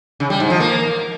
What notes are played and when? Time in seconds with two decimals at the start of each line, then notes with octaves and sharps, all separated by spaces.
0.20 C#3
0.30 G3
0.40 G#2
0.50 F3
0.60 A#3